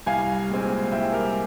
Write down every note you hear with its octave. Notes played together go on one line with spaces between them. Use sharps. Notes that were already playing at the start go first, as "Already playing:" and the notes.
C2 F5 G#5
A#2 G#3 C4
C2 E5 G5
G4 A#4